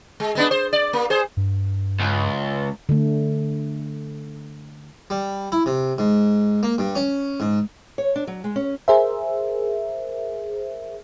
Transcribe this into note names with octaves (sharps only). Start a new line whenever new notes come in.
G#3
G#3 B3 D4
C5
D5
A#3
G#4 C5
G2
C#2
D3 A3
G3
E4
C3
G#2
A#3
G2
C#4
G#2
C#5
D4
F#3
G#3
C#4
G#4 A#4 C5 E5